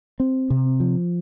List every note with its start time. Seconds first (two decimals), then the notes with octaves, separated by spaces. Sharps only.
0.20 C4
0.50 C3
0.80 F3